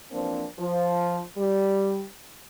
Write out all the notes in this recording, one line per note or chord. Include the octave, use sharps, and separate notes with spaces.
E3 F3 A#3 C4 D4
F3
G3